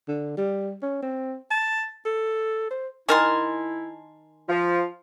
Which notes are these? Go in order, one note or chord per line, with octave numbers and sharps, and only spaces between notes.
D3
G3
C#4
C4
A5
A4
C5
D#3 E4 A#4 G#5 A5 C6
F3 F4